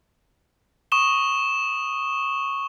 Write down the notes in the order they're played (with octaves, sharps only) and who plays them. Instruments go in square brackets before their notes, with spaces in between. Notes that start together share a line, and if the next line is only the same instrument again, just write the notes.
[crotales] C#6 D#6 E7 G7